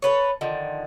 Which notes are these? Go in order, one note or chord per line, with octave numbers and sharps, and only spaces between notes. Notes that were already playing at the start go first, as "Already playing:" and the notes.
A4 B4 C#5
D3 D#3 F3